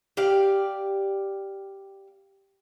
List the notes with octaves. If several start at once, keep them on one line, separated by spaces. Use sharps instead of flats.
G4 D5 F5